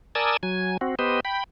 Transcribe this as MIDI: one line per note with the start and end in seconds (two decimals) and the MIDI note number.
0.15 0.37 70
0.15 0.37 74
0.15 0.37 80
0.15 0.37 81
0.15 0.37 87
0.15 0.37 88
0.43 0.77 54
0.43 0.77 80
0.81 0.95 60
0.81 0.95 66
0.99 1.20 59
0.99 1.20 67
0.99 1.20 71
0.99 1.20 72
0.99 1.20 75
1.25 1.44 79
1.25 1.44 83